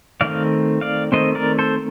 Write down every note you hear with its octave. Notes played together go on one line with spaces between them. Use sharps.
D#3 A3 C4 D5 F5
D5 F5
D#3 A3 C4 C5 D#5
A#4 D5
A4 C5